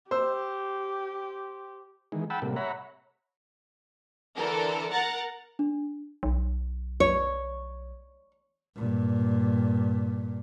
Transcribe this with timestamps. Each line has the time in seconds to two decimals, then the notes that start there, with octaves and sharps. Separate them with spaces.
0.11 G4 C5 E6
2.12 D#3 E3 G#3
2.30 F#5 G5 A5 B5 E6
2.42 A2 C3 G3 A#3
2.56 C#5 E5 F#5 A#5 B5
4.36 D3 E3 A4 A#4
4.92 A#4 F#5 A#5 A6
5.59 D4
6.23 B1
7.00 C#5
8.76 G2 A#2